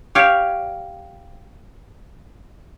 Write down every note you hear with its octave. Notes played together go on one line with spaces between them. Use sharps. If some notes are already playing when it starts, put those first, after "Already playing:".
G4 C#5 F5